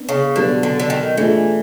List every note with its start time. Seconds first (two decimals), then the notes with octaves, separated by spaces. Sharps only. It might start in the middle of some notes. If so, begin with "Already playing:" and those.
Already playing: B3 D4
0.09 C#3
0.36 B2 D3 F#3 B3 D4 G4
0.63 D3
0.79 D3
0.90 D#3
1.17 E3 A3 D4 F4 G#4